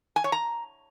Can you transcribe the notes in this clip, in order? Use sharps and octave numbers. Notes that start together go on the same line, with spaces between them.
G#5
C#5
A#5